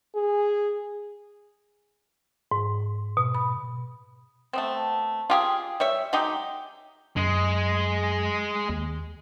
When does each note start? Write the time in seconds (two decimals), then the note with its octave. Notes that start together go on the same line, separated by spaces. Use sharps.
0.15 G#4
2.52 G#2
3.17 B2
3.35 B5
4.53 A3 B3 C4
5.30 F4 G4 G#4
5.80 G3 C#5 E5
6.13 F#3 G#3 D#4 G4
7.17 F#2 G#3
8.70 D#2